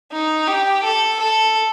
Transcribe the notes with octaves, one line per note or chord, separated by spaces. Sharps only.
D#4
G4
A4
A4